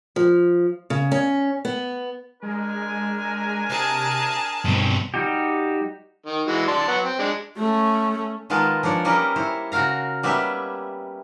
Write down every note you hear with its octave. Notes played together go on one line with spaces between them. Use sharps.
F3
C#3
C#4
B3
G#3 D4 A#4 G#5
C3 G#4 A5
G2 B2 C4
G3 D#4 F#4 G4
D#3
E3 G#3 F#4
D5 A5 C6
F#3 B3 F#5
C4
G#3 D4
A3 C#4
D#3 G#3 B3 F4 A#4 A5
F3 D4 C#5 D5
G3 A#3 C#4 A#4 B4 D#5
E4 C5 C#5
C#3 F#4 A#4 F5 A#5
G3 A#3 B3 C#4 G4 E5